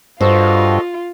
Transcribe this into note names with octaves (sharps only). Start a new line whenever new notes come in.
G2 F4 F#4 A4 C5 D#5